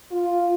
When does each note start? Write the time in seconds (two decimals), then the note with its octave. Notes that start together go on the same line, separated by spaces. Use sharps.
0.10 F4